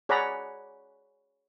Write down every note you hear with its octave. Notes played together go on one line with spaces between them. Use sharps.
G#4 C#5 D5 F#5 A#5 B5